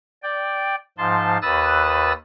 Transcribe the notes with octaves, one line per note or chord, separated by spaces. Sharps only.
D5 G5
G#2 F3 A5 C6
D#2 B4 D#6 E6 F#6 A6